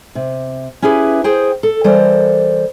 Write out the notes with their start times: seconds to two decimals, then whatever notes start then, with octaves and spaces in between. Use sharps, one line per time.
0.15 C3
0.82 C#4 E4 G4 G#4 B4
1.24 G#4 C5 G5
1.63 A4
1.84 E3 G3 A4 A#4 C5